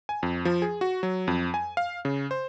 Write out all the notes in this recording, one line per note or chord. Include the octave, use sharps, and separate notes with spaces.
G#5
F2
F3
G#4
F#4
F#3
F2
G#5
F5
C#3
C5